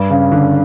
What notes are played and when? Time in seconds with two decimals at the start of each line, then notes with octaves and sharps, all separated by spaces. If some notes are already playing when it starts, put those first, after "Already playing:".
Already playing: G2
0.10 C#3
0.32 D3